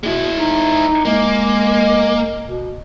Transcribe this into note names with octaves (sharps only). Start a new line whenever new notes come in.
B2 G#3 E4
D#4
G#3 A#3
B2